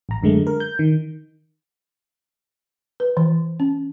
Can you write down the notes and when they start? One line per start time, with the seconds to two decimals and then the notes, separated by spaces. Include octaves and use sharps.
0.09 A1 A#5
0.23 F#2 D3 G#3 A3
0.47 A#4
0.60 G6
0.79 D#3
3.00 B4
3.17 E3
3.60 C#4